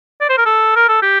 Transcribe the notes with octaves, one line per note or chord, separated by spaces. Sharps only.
D5
C5
A#4
A4
A#4
A4
G4